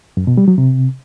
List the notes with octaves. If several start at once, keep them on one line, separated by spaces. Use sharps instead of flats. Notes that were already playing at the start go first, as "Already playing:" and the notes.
F#2
B2
G3
F#3
C3